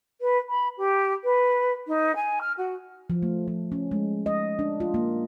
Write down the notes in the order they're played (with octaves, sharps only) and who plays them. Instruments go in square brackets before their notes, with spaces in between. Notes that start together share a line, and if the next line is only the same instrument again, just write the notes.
[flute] B4
B5
G4
B4
D#4
G#5
F6
F#4
[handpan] F3
A3
F3
C#4
G#3
D#5
D4
F4
A#3